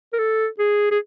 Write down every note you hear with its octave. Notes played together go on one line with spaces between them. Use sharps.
A#4
A4
G#4
G#4